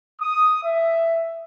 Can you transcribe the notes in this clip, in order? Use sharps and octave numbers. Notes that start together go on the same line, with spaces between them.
D#6
E5